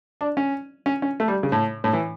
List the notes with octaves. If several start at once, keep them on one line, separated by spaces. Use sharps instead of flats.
D4
C#4
C#4
C#4
A3
G3
C#3
A2
A2
E3